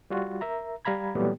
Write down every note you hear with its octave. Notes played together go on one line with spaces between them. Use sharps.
G3 F4 F#4
A#4 E5 A#5
G3 F5 A#5 B5 G#6
A#2 E3 F#3 G3 A3 B3